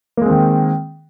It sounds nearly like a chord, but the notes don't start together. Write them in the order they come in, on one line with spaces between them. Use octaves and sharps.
A#3 G#3 C4 D#3